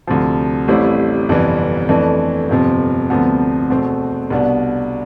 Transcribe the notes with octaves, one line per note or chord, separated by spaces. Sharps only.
D2 C3 F3
A1 A2 G3 C4 E4
G1 F2 C3 E3 G3
F2 E3 A3 D4
G1 F2 C3 F3
D2 C3 F3 B3
E2 B2 A3 C4
C2 B2 B3 D4